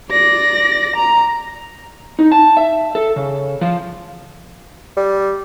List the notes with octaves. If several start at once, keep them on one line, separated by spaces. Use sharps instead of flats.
D5 A#6
A#5
D#4
A5
E5
A4
C#3
F3
G3